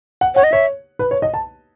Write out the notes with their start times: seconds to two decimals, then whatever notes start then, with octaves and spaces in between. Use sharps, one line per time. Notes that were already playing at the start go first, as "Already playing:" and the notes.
0.21 F#5
0.35 C#5 F#5
0.44 D#5
0.52 C#5 E5
0.99 B4
1.11 C#5
1.22 D#5
1.34 A5